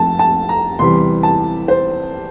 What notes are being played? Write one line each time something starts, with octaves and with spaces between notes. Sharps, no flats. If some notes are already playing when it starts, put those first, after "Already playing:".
Already playing: F2 A3 A5
A5
A#5
E2 C3 E3 G3 C6
A5
C5